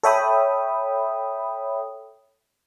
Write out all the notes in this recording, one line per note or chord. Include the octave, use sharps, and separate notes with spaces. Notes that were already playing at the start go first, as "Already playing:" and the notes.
A4 C#5 E5 G5 B5 D#6